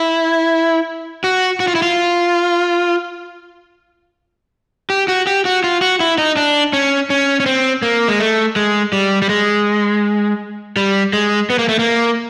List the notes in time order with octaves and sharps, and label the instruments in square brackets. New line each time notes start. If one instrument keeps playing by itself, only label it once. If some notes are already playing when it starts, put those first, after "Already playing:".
Already playing: [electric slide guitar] E4
F#4
F#4
F4
E4
F4
G4
F#4
G4
F#4
F4
F#4
E4
D#4
D4
C#4
C#4
C#4
C4
A#3
G#3
A3
G#3
G3
G3
G#3
G3
G#3
B3
A#3
A3
A#3